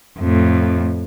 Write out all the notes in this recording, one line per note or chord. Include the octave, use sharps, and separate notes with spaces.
F2 A2